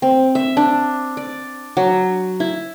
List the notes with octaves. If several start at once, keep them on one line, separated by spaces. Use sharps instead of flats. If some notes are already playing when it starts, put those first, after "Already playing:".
C4
E5
D4
D5
F#3
E4